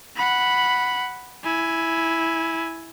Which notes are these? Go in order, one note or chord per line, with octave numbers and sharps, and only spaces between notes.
F#5 B5
E4 G#5